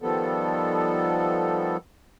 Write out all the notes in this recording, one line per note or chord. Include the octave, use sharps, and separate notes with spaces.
D#3 F3 G3 B3 A4